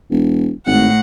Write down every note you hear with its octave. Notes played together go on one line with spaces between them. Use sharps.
E1
G#1 A2 F#5